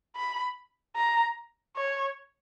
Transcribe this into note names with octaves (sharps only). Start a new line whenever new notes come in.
B5
A#5
C#5